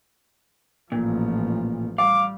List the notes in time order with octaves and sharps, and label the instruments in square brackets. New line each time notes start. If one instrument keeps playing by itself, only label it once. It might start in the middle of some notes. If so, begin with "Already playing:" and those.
[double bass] A1 F3 [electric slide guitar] A#2
[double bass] G3 [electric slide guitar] F5 [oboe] D6